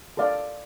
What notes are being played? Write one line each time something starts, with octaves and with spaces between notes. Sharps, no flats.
A4 D5 F5